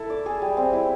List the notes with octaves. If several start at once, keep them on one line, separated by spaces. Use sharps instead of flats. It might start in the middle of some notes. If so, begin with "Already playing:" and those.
Already playing: E4 A4
D5
G#4
G3
C4
E4